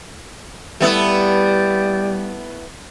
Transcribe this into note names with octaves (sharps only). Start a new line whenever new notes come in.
G3 A3 B3 E4